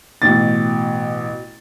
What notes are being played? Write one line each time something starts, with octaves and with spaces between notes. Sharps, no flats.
A1 B2 A6